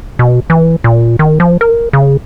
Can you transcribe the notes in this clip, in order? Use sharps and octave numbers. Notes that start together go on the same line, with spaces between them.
B2
E3
A#2
D#3
F3
A#4
C#3